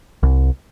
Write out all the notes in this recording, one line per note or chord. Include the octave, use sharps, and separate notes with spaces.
C2